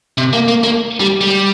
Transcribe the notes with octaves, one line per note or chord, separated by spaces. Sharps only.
C3
A#3
A#3
A#3
G3
G3